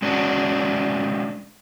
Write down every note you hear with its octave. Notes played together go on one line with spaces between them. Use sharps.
G#3 C#4 D4 F#4 F#5